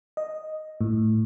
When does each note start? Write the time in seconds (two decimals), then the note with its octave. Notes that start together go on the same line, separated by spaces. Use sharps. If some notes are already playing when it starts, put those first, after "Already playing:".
0.17 D#5
0.81 A2